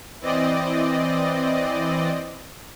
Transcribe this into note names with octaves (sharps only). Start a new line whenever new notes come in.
E3 C4 D5 D#5